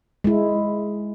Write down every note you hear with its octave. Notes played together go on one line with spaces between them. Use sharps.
G#3 E4